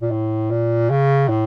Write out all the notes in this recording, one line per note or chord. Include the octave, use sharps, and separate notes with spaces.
A#2
A2
A#2
C#3
A2